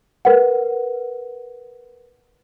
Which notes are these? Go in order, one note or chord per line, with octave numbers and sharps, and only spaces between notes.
A#4 B4 F#5